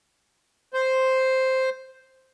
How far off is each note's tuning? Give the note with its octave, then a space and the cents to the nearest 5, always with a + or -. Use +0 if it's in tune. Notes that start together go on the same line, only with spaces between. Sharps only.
C5 +0